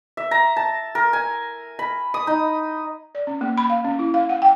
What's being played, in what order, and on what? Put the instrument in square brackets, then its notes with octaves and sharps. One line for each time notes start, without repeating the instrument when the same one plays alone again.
[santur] E5
A#5
A5
A#4
G#5
B5
D#6
D#4
[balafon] D5
C#4
A#3
B5
F5
C#4
E4
F5
F#5
G5